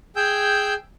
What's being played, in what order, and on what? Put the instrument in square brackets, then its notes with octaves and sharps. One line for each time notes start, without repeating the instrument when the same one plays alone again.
[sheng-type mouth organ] G#4 G5 G#5 E6 G6